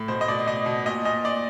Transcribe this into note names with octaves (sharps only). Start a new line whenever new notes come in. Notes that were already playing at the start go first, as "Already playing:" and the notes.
Already playing: A2
B2 C5
D#5
B2 D5
B2 D#5
B2
A#2 D#5
A#2 D#5
A#2 D5